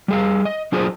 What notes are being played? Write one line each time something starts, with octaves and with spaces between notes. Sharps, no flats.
G3 G#4 F5
D#5
F#3 D4 F4 G#4 C5